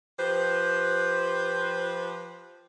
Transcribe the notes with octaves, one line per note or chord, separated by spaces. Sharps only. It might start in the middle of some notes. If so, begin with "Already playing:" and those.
F3 G4 B4 C5